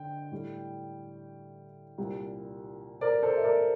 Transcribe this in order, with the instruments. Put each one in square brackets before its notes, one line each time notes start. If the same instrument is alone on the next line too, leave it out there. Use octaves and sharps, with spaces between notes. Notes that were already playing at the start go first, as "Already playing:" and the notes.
Already playing: [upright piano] D3 G5
A2 G3
C2 A#2 G3
A#4 D5
A4 C5
E5
A#4 D5